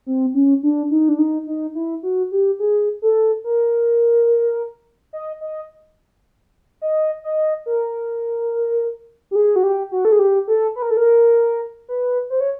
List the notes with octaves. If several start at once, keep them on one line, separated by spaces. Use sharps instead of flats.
C4
C#4
D4
D#4
D4
D#4
D#4
E4
F#4
G4
G#4
A4
A#4
D#5
D#5
D#5
D#5
A#4
G4
G#4
F#4
G4
F#4
A4
G#4
G4
A4
B4
A#4
A4
A#4
B4
C5
C#5